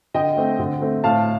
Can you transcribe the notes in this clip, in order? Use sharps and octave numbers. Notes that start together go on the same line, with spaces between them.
D3 D#5 G5
A3 C4
D3
A3 C4
A2 F5 A5